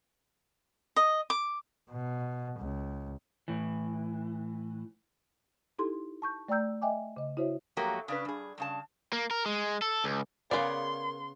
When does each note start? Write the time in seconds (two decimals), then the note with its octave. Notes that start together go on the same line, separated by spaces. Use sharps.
0.96 D#5
1.30 D6
1.91 B2
2.59 C#2
3.48 A2 E3
5.79 D#4 E4 G4 A4 C6
6.22 A5 C#6 G6
6.49 A3 D5 G5 A#5 E6 G6
6.82 D#5 E5 G5 G#5 D6
7.17 C#3 D#5
7.37 E4 F#4 C5 C#5 E5
7.77 G#2 F3 F#3 A3 A#3 G4
8.08 C#3 D4 B4
8.25 G2 G#4
8.58 G2 C#3 A5
9.13 A#3
9.31 A#4
9.46 G#3
9.82 A4
10.04 C#2
10.51 C#3 B3 G#4 A#4 C#5 D5 F5 C6